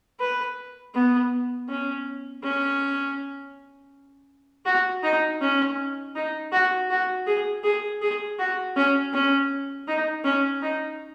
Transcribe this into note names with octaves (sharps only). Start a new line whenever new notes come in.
B4
B3
C#4
C#4
F#4
D#4
C#4
D#4
F#4
F#4
G#4
G#4
G#4
F#4
C#4
C#4
D#4
C#4
D#4